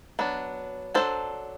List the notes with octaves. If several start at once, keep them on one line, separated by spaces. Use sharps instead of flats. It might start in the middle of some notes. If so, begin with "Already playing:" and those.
F#3 B3 D4
F#3 B3 D4 A4 C5